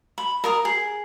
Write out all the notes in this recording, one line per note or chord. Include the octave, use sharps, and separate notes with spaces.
B5
A#4 A#5 D#6
G#4